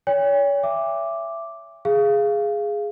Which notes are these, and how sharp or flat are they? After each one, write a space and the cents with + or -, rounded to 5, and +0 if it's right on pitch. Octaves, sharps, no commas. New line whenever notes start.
C#5 +35 G5 +45
E5 +20 D6 +0
G#4 +0 F5 -15